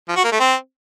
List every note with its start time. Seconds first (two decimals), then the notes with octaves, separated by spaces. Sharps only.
0.08 F3
0.16 F#4
0.24 A#3
0.32 A3
0.40 C4